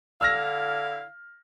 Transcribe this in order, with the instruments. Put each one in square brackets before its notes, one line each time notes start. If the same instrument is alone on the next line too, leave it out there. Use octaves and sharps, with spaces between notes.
[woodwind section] D3 E4 [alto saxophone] F5 [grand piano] E6 F6 A#6